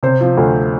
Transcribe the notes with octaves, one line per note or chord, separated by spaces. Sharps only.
C3 C5
F3
D2